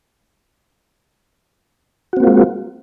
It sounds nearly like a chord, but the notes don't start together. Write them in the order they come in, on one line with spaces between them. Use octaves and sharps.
F#4 C4 A#3 F4 G#3